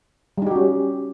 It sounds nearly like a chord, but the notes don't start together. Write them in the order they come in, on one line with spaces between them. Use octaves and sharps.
G3 D#4 G4 F#4 C#4